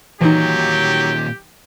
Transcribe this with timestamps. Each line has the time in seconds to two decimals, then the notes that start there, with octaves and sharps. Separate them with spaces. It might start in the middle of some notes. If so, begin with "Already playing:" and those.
0.21 A#2 D#3 E3 F#3 D#4 G4